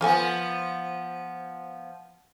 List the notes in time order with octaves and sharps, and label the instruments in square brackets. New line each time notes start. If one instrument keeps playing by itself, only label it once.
[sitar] F3 B3 [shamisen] F4 A4 G#5